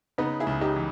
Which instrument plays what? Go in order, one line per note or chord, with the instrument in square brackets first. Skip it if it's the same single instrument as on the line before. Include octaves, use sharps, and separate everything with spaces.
[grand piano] C#3 [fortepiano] B3 D#4
[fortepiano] E4 G#4
[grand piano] C#2
[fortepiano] D#4 G4
[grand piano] E3